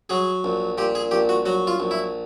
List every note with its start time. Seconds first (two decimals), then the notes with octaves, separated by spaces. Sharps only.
0.10 F#3 G#4
0.44 A#1
0.78 A#2 G4
0.95 G#4
1.11 A#1 G4
1.29 F#4
1.46 F#3 F#4
1.67 F4
1.80 A#1
1.91 E4